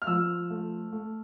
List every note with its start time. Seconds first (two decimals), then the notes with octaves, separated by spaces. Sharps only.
0.02 F6
0.07 F3 E6
0.50 A3
0.92 A3